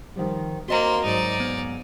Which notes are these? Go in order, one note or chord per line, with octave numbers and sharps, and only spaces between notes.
D#3 F3 G3
A#3 C4 F#4 D#5 A#5 C6
G#2 F#3 D#4 D5
B3